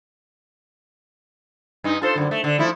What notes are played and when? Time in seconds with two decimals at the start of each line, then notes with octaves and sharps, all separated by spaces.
1.84 G2 D#4
2.02 F4 A4 C5
2.16 F#2 D3
2.31 A3
2.44 D3
2.58 F3 A3 E4